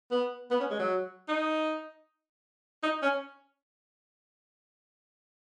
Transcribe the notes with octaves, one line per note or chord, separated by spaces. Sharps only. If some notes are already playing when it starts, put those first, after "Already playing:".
B3
B3
C#4
G#3
F#3
D#4
D#4
C#4